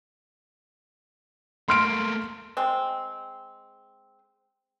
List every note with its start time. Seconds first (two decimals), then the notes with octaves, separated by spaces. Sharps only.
1.68 A3 A#3 C6 F6 D7
2.57 G#3 C4